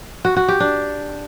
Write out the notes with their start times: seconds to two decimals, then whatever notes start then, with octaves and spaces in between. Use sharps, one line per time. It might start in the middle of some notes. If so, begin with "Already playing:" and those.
0.25 F#4
0.37 F#4
0.48 G4
0.60 D4